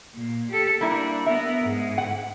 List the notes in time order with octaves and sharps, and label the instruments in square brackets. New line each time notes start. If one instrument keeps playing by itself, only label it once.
[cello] A#2
G4 A4
[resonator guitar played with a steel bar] G3 A#3 E4 [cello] D4
[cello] B3 A#4 [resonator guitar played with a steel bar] E5
[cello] G#2
[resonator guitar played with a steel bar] F#5